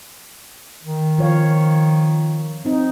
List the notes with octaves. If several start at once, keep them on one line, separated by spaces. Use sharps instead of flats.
D#3
F3 C#5 F5
C4 D#4